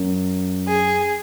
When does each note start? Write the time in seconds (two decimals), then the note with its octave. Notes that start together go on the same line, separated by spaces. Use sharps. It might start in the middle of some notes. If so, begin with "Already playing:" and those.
Already playing: F#2
0.68 G#4